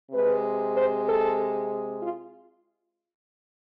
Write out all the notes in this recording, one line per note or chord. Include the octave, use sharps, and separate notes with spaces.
C3 G#3 B4
C5
A4
F4